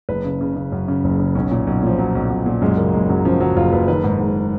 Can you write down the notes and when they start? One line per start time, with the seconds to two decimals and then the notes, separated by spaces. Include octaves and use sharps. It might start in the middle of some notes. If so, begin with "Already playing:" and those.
0.09 F#1 B4
0.24 C#3
0.41 C#3
0.56 C#3
0.72 F#2
0.88 C#3
1.04 F#1
1.20 C#3
1.35 B1 C#4
1.51 A#2
1.67 B1
1.83 A#2 F3
1.98 A#2 F#3
2.15 B1
2.31 B1
2.46 A#2
2.62 F#2 G#3
2.78 C#3 A#3
2.93 F#1 G#3
3.09 F#2 F#3
3.25 C#3 F3
3.40 C#3 F#3
3.57 F#1 F4
3.72 F#1 B4
3.88 D#3 B4
4.04 G#2
4.20 G#2